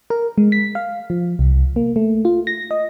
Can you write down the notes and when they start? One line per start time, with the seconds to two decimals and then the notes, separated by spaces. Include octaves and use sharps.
0.10 A#4
0.38 G#3
0.52 B6
0.75 F5
1.10 F3
1.39 C2
1.76 A#3
1.96 A3
2.25 F4
2.47 A#6
2.71 D#5